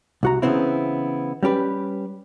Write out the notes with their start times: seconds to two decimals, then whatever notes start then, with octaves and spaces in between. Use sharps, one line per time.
0.23 C2 F#4 A#5
0.42 C#3 E3 B3 C4 E4
1.43 G3 C#4 G4 B4